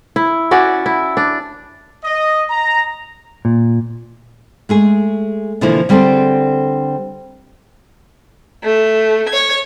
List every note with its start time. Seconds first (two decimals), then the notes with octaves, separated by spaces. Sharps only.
0.16 E4
0.51 C#4 F#4 D5 E5
0.86 E4
1.17 D4
2.04 D#5
2.50 A#5
3.45 A#2
4.69 G#3 A3 G#4
5.61 B2 D3 E3 F3 A#3 E4
5.89 D3 G3 C4 G#4 A4 C5
8.64 A3
9.29 C#5 G#6